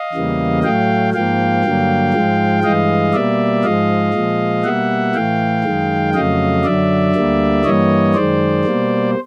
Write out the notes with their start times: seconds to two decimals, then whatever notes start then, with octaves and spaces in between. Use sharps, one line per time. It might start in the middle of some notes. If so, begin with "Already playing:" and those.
Already playing: D#5 F5
0.13 E2 C#3 E3 G3 A#3
0.63 A2 F#3 A3 F5 G5
1.13 G#2 F3 A#3 F5 G5
1.63 G2 D3 F#3 A#3
2.14 G#2 F3 G#3
2.63 G2 E3 G#3 D#5 F5
3.13 B2 G3 A#3 D5 E5
3.63 G#2 F3 G#3 D#5 F5
4.14 A#2 F3 G#3
4.64 B2 G3 A#3 E5 F#5
5.14 A2 E3 A3 F5 G5
5.64 F#2 D#3 G#3
6.14 F2 C#3 F#3 A3 D#5 F5
6.64 F#2 D3 F#3 D5 E5
7.15 D2 D3 G3 A#3
7.64 G2 E3 G3 A#3 C#5 D#5
8.14 F#2 D#3 G#3 C5 D5
8.65 B2 G3 A#3